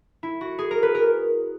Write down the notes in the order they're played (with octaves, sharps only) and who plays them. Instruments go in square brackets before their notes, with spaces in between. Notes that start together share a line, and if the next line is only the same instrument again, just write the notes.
[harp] E4
F#4
G#4
A#4
B4
A#4